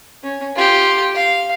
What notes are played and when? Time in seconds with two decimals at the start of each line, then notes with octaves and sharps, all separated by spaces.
0.23 C#4
0.55 F4 G4
1.15 F5